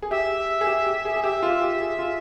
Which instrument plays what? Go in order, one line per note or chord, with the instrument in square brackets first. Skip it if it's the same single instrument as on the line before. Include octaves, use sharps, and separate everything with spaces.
[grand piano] G#4
[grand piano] G4 [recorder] E5
[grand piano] G#4
G4
G4
G#4
G#4
[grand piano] G4 [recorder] E5
[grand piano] F4
G4
G#4
F4